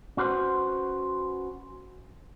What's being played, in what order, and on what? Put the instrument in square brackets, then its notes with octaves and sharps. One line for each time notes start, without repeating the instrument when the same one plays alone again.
[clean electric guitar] C#4 F#4 B4 C5